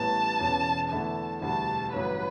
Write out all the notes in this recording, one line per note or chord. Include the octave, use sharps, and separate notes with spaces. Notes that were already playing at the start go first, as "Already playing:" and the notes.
Already playing: A1 A2 G3 B3 A5
E1 E2 C#3
E2 D3 A3 E4 A5
E1 D2 D3 G3 D4 A5
A1 G2 D3 F#3 B4